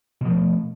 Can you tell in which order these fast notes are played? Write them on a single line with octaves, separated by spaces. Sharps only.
B2 F3 A3